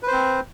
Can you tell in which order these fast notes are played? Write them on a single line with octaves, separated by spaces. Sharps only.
B4 C5 C4